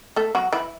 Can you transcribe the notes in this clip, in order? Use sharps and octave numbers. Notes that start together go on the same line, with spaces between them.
A3 A4
F#3 F#4
E3 E4